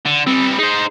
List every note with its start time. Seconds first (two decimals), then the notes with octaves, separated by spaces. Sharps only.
0.05 D3
0.27 G3 B3 C4
0.59 D#4 G#4 C5